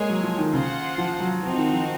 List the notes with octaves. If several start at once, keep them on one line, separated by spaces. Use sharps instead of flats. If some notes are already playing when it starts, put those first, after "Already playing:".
Already playing: G#3 A#3 G#4 C#5 G#5
F#3
F3
D#3
C#3 F4 C5 F#5
F3
F#3
F3 C4 D#4 F#4
D#3
F3